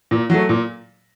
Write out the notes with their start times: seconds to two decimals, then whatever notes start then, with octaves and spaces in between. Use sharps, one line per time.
0.11 A#2
0.30 F#3 A3
0.49 A#2